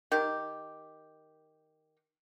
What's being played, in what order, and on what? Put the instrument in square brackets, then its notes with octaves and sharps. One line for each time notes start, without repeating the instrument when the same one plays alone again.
[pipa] D#3 G4